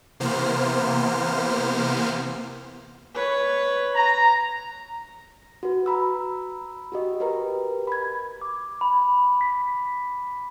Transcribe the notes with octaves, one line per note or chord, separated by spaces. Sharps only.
C3 E3 A#3 B3 C5 F6
B4 C#5
A#5
F#4 B4
A#5 B5 E6
F#4 G4 D#5
G4 A#4 B4 A#5
B5 G#6
D6
B5
B6